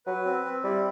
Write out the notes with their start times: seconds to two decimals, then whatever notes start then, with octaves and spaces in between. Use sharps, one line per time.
0.06 F#3 B4
0.25 C4
0.45 C4
0.64 G3 E4